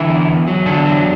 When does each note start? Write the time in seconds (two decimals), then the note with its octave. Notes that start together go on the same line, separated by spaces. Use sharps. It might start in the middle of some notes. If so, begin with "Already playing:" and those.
Already playing: D3 E3 E4
0.09 E2
0.28 E2
0.47 F#3
0.65 E2 D3 D4
0.85 F#3